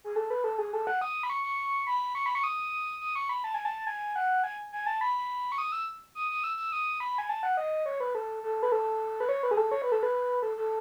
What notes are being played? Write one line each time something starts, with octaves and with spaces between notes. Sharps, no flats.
G#4
A4
B4
A4
G#4
A4
F#5
D#6
B5
C#6
C#6
B5
C#6
B5
C#6
D#6
D#6
C#6
B5
A5
G#5
A5
G#5
F#5
G#5
G#5
A5
B5
C#6
D#6
E6
D#6
D#6
E6
E6
D#6
B5
G#5
A5
F#5
D#5
C#5
B4
A4
A4
B4
A4
B4
C#5
B4
G#4
A4
C#5
B4
A4
B4
A4
A4